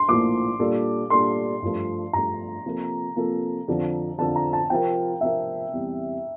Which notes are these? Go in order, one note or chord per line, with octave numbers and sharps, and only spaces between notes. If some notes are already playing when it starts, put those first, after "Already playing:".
Already playing: C6
A#1 A2 F3 A#3 D6
A#2 G3 D4 A4
A#2 G3 D4 A4 C6
G2 F3 A3
G2 F3 A3 A#5
C3 F3 A#3 F4 A4
C3 F3 A#3 F4 A4
F2 D3 F3
F2 D3 F3 A5
A#5
A5
C3 F3 C4 F4 A#4 G5
C3 F3 C4 F4 A#4 E5
E2 C3 G3